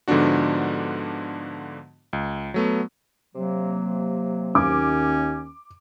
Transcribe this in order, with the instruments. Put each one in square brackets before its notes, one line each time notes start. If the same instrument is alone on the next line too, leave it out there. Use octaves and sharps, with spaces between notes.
[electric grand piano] G#2 D3 F3 B3 D4 F#4
C#2
F#3 A3 B3
[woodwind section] C3 F#3 A#3
[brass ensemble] D#2 [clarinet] C#4 [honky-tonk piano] D6